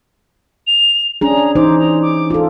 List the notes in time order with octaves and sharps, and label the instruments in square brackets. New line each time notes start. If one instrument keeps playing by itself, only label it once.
[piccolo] F7
[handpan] C#4 D4 G#4 [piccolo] A#5
[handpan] E3 D#4 C5 [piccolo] D6
[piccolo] A#5
D6
[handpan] F4 A4